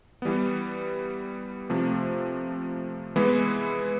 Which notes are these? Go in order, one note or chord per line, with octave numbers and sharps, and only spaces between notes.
E3 G3 B3
C3 F3 A3
E3 G#3 B3 E4